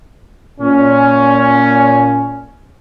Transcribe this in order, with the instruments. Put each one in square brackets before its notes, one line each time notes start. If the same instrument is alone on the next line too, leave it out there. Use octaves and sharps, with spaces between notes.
[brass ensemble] A#2 C#4